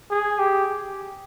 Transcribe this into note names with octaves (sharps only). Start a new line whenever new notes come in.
G#4
G4